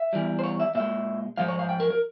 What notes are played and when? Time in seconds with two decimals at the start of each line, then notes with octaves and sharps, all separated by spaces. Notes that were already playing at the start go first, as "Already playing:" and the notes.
Already playing: E5
0.13 E2 E3 G3
0.39 C5
0.44 C#5
0.60 E5
0.75 A#2 G#3 E5
1.38 G#2 F3 G#3 F5
1.48 C#5
1.59 F5
1.69 G5
1.80 A#4
1.90 A#4